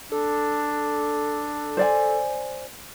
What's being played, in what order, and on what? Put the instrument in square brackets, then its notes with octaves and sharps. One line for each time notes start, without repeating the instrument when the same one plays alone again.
[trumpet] D4 [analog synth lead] A4
[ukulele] C5 D5 G#5